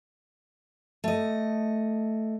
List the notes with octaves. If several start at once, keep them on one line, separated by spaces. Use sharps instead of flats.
A3 D#5